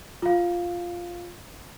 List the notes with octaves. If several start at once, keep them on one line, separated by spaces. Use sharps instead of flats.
F4 F5